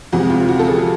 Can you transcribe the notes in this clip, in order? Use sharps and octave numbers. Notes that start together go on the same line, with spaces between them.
F2 C3 E3 G#3 F#4
F4
F4
F#4
A4
G#4